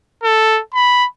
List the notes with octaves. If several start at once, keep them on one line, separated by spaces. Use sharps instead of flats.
A4
B5